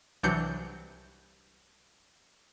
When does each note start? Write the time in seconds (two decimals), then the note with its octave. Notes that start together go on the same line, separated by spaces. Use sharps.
0.23 C2 E3 F#3 D4 G6 C#7